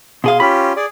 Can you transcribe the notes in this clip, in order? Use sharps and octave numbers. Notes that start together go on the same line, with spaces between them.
B2 G#4 F5 C6
C#4 F4 G4 B5
G#4 D5